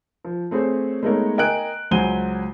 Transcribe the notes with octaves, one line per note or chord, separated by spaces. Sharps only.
F3
A3 C4 G#4 C5 C#5
G#3 A3 B3 D#4 A#4 C#5
A#4 D#5 G5 G#5 F#6 D7
C#2 F#3 C5 G#5 D#7 G7